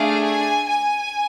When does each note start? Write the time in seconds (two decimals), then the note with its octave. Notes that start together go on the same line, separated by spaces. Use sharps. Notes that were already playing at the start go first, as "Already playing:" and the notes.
Already playing: A3 D4 G#4 F5
0.23 G#5
0.69 G#5